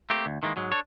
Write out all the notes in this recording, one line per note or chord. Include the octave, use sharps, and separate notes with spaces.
A3 A#3 C4 G4
D2
D#3 E3 G#3 A#3
G#2 F#3 G#3
D4 A4 C#5